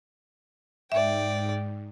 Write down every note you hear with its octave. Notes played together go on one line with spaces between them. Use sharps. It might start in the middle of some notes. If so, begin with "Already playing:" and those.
G#2 D5 E5 G5